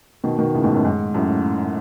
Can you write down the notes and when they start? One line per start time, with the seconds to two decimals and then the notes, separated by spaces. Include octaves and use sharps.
0.24 B2 D#3
0.38 B2 D#3
0.54 A2 C#3
0.64 G#2 B2
0.74 F#2 A2
0.84 G#2
1.14 F#2 A2